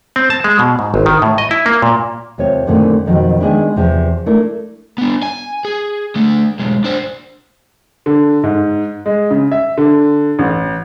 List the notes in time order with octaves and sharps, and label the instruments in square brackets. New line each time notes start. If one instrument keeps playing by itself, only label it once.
[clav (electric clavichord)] C4
A5
G#3
B2
G#2
G#1
D#3
A2
D#5
E4
A#3
A#2
[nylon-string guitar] D#2 C3 C4 F4 C#5
F#2 A#2 D3 D#3 A3 C4
F2 B2 D#3 F3 F#3
D#3 G#3 B3 D4 E4
E2 C3 F3
A3 D4 E4 A#4
[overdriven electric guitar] B3 D4
G#5
G#4
D3 A3
B1 G#3
D4 C5
[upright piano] D3
G#2
G#3
C#3
E5
D3
A1